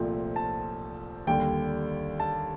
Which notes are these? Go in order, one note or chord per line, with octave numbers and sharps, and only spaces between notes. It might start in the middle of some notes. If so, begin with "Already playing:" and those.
Already playing: C2 A#2 F3 A3 C4
A5
D#2 D3 G3 G5
A5